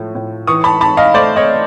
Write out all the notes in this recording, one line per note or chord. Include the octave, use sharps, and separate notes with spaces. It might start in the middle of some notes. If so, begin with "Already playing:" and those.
Already playing: A2 F3 A3
A2
E3 C#6 D#6
A5 B5
G#2 A5 B5
D#5 F5
A3 C5 D5
C#5 D#5